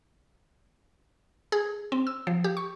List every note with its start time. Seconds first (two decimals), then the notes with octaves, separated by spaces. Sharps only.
1.52 G#4
1.92 C4
2.07 E6
2.27 F3
2.44 G4
2.57 C#6